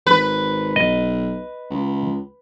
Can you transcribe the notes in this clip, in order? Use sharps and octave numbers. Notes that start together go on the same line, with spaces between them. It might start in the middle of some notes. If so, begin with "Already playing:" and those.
G#1 B4
B1 D#5
C#2